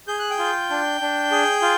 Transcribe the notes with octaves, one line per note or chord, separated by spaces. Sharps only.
G#4 G6
F#6
G5 G6
F4
D4
D4
G#4
F4